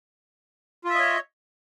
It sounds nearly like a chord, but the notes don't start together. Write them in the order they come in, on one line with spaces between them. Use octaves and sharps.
F4 E5 D#5 C#5